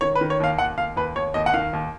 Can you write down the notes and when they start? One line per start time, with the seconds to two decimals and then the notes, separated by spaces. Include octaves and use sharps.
0.01 D#3 C#5
0.15 B4
0.21 D#3
0.30 C#5
0.40 D#2 F5
0.58 D#2 F#5
0.78 D#2 F5
0.96 D#2 B4
1.16 D#2 C#5
1.34 D#2 D#5
1.46 F#5
1.54 D#3 F5
1.73 D#2